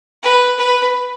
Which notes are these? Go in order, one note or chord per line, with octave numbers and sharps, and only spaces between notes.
B4
B4